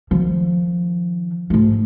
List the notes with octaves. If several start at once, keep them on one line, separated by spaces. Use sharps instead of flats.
D#3 F3
G#2 A3